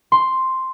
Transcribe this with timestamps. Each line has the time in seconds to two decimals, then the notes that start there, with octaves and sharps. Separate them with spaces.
0.12 C6